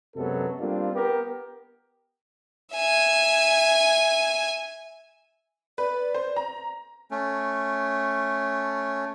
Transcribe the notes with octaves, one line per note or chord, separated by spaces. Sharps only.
F#2 C3 F#3 G#3 B3 A4
G3 A#3 C4 D4 F4
B3 G4 A#4
E5 G#5
B4 D5
C5
A#5
A3 C#4